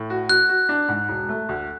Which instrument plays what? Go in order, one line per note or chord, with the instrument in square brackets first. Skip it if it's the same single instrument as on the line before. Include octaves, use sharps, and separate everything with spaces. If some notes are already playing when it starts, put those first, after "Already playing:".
Already playing: [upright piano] A2
F#4
[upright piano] F#4 [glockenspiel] F#6
[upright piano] F#4
D4
G#2
E1
A3
D2